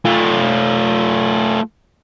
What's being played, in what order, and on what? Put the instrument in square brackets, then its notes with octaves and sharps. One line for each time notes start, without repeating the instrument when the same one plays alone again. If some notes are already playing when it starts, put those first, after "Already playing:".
[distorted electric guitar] A3 F4